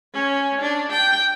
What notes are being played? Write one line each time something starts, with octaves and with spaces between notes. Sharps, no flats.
C#4
D4
G5